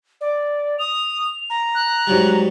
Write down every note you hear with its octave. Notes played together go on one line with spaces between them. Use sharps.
D5
D#6 F7
A#5
F#6
G#2 F#3 G3